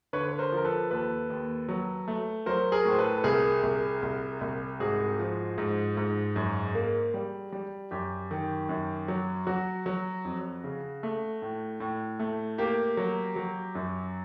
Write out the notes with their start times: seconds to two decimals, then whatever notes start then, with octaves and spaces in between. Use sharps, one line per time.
0.13 D3 B4 C#5
0.28 B4
0.39 A#4 C5
0.52 F3 A#4
0.65 A4 B4
0.91 D#2 A4 B4
1.30 D#2
1.69 F#3
2.08 A3
2.46 F#3 A#4 C5
2.72 G#4 A#4
2.85 A2 C5
2.98 A4 B4
3.18 A4
3.24 C2 G#4 A#4
3.63 C2
4.02 C2
4.41 C2
4.80 G#2 F#4 G#4
5.19 F3
5.58 G#2
5.97 G#2
6.36 F#2
6.75 A#3
7.14 G3
7.52 G3
7.91 F#2 G4
8.31 D#3
8.69 F#2
9.08 F#3
9.47 F#3 F#4
9.86 F#3
10.25 F2
10.64 C#3
11.03 A3
11.42 A2
11.80 A2
12.19 A3
12.58 A#3 G4
12.97 F#3
13.36 F#3
13.75 F#2